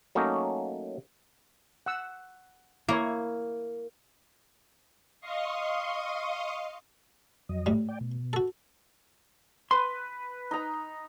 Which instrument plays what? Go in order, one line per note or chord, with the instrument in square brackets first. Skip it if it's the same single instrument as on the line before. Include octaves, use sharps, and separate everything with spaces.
[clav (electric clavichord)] F#3 A3 A#3 C#4 D#4
[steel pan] F#5 E6
[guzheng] A#3 [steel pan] E4 C#5
[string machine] D#5 F5 C6 C#6 D#6
[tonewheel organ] F2 F#3 D#5
[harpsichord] A2 G3
[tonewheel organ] D5 G5
B2
[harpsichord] F#4 A4
[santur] B4 [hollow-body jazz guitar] C6
[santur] D#4 A#5